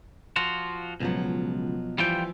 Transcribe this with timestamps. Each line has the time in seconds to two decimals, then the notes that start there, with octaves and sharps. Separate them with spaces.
0.36 F3 F4 F#4
1.00 C#2 B2 F3 F#3
1.98 E3 F3 G3 F4 G5